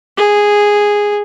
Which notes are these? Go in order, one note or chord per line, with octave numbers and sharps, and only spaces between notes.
G#4